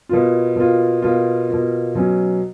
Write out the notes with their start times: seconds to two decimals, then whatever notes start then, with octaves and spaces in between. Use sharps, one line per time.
0.09 B2 A#3 F4
0.56 B2 A#3 F4
1.02 B2 A#3 F4
1.49 B2 A#3 F4
1.95 B2 F#3 C#4